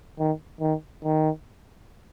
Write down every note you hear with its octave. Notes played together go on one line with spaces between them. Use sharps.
D#3
D#3
D#3